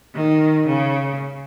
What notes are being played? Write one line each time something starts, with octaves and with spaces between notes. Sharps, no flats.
D#3
C#3